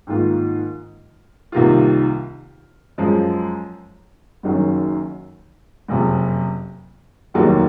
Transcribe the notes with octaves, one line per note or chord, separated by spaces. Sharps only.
G#2 D#3 A#3 F4
C2 C3 D#3 A#3 F4
F#2 F3 G#3
F#1 F#2 D#3 F#3
F#1 F2 C3
F1 D#2 D#3 F#3 A#3